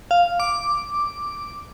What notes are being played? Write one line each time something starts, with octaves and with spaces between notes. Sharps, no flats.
F5
D6